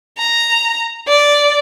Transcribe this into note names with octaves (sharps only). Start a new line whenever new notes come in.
A#5
D5